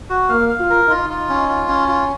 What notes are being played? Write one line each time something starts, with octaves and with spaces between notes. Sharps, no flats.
F#4
A#3 F5
F5
F4
A#4
D#4 F4
F4
C#4
F4
C#4
F4